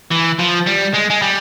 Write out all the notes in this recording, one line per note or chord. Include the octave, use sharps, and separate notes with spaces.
E3
F3
G3
G#3
G#3
G3